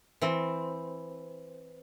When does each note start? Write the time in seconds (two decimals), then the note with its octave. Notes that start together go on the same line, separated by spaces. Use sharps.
0.22 E3 C4